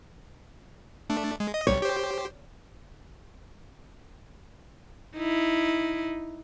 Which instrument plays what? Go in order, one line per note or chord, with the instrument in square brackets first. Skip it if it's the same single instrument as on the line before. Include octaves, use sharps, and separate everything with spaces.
[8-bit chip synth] A3 D4
G#3
D#5
[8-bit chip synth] B1 G3 [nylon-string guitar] C#5
[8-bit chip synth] G4 C5
[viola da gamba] D#4 E4